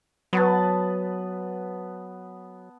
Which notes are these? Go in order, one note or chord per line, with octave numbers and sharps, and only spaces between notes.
F#3 B3 B4 A5